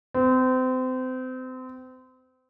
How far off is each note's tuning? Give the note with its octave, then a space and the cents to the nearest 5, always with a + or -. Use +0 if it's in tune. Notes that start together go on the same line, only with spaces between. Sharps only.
C4 -30